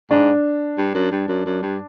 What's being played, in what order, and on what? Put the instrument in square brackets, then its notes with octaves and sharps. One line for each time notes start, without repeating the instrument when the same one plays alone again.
[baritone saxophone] G#2 [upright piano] D4
[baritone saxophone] G2
F#2
G2
F#2
F#2
G2